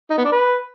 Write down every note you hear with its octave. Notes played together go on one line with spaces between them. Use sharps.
D#4
B3
D4
B4